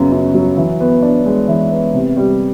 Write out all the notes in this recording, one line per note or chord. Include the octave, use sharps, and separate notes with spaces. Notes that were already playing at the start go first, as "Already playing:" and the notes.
Already playing: F#2 C#3 F#3 B3
F#2
F#3
E3
B3
D4
G#3
E3
B3
C3
G3